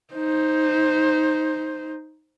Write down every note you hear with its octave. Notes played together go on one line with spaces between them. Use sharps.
D#4 C5